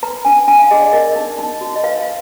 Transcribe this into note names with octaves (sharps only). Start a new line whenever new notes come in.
B4 A#5
D4 G#5
D4 G#5
F5
G#4 D#5
D5
A#4 D#5
D#4
D#4
F#4
D#5
B4 F5
F5